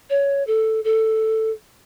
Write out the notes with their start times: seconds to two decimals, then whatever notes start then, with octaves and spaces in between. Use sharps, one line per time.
0.10 C#5
0.47 A4
0.84 A4